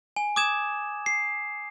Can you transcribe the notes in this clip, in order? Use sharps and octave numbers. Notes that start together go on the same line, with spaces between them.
G#5
D6 D#6 G#6 E7
C7